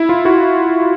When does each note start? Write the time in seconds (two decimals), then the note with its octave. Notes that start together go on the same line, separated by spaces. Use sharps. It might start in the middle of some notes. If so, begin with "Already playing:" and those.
Already playing: E4
0.09 F4
0.25 E4 F#4